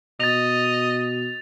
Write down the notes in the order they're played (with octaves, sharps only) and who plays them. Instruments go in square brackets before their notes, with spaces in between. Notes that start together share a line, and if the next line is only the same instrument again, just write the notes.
[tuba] B2 [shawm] D#5 [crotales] A6 F7